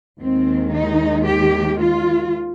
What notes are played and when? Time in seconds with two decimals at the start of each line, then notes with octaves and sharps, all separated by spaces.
0.19 D#2 D#3 G#3 C4
0.73 D#4
1.26 G4
1.80 F4